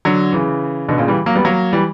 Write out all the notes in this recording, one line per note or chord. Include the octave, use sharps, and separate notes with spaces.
D3 F#3
C#3 E3
B2 D3
A#2 C#3
E3 G3
F#3 A#3
G3 B3
F#3 A#3
E3 G3